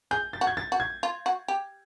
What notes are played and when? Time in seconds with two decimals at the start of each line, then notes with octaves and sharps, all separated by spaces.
0.11 G#4 G6
0.33 A6
0.41 F#4
0.47 G#6
0.57 A6
0.72 F#4
0.80 G#6
1.03 F4
1.26 F#4
1.48 G4